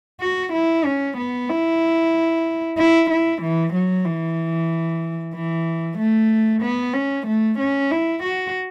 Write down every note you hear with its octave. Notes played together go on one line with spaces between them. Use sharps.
F#4
E4
C#4
B3
E4
E4
E4
E3
F#3
E3
E3
A3
B3
C#4
A3
C#4
E4
F#4